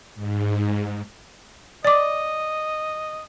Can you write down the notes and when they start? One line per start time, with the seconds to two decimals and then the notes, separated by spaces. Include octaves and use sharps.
0.15 G#2
1.85 D5 D#5 D6